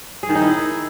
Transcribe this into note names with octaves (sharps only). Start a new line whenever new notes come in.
G#4
D#3
D#4
E4